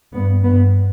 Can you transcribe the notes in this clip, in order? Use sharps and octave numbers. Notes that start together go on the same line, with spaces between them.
G2 B3
G2 B3